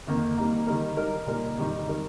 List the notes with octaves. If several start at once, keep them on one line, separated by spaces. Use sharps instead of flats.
F2 D#3 A#3
G3 A#3 D#4
D#3 G3 D#4 A#4
G3 D#4 A#4
A#2 G3 D#4 A#4
F2 D#3 G3 D#4 G4
D#3 G3 D#4 A#4